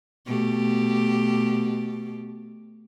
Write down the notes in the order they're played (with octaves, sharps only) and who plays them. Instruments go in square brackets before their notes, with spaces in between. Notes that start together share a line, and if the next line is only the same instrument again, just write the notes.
[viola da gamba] B2 A3 G4